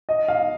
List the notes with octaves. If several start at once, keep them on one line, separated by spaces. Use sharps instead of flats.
D#5
F5